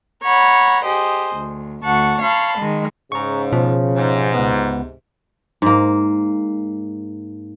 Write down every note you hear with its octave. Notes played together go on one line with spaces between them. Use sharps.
C#5 F#5 A#5 B5
G4 G#4 C5 D#5
D2
D2 F#5 A5 C#6
C#5 F5 A5 B5 C6
D#3 G#3
G#2 C#3 A#5 C#6
B2 F3
G#2 C3
C#2 B3
G#2 A#3